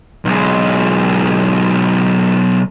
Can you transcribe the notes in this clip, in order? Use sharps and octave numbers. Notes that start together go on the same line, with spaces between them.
B1 G#3